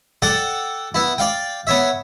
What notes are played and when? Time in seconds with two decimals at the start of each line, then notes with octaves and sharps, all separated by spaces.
0.22 A4 D5 F#5 G5
0.94 B3 E4
1.18 D5 F5 G5
1.67 B3 C#5 E5